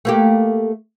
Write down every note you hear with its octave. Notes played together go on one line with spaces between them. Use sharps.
A3 A#3 G4